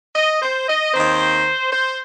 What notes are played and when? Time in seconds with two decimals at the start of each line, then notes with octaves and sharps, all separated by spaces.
0.14 D#5
0.41 C5
0.68 D#5
0.93 D#2 D#3 C4 C5
1.72 C5